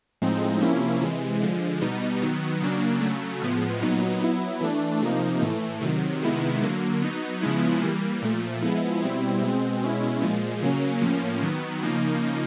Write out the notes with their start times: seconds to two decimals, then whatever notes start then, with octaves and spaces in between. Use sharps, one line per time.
0.22 A2 F3 G#3 C4 D#4
0.61 C3 F3 A#3 C#4 E4
1.02 C3 E3 G#3
1.42 D3 F3 G#3
1.81 B2 G3 B3 D#4
2.22 D#3 F#3 B3
2.61 C#3 F#3 A#3 D4
3.01 C#3 F#3 A3
3.42 A2 F3 G#3 B3
3.81 A#2 F#3 B3 D#4
4.21 F#3 B3 E4
4.61 E3 A3 D4
5.01 C3 F3 A#3 D#4
5.42 A2 E3 A3
5.81 C3 D#3 F#3
6.21 C3 D#3 G#3 B3 E4
6.62 D3 F#3 A#3
7.01 F#3 B3 D#4
7.41 C#3 F3 G#3 B3 E4
7.82 E3 G3 A#3
8.22 A#2 F3 A3
8.62 F3 G#3 B3 E4
9.02 B2 G3 C4 E4
9.41 B2 G#3 C4
9.81 B2 G#3 C#4 E4
10.22 A#2 F3 G#3
10.62 C#3 F#3 A#3 C#4
11.02 A2 F3 A#3 C#4
11.42 D#3 F#3 B3
11.82 C#3 F3 A#3 D#4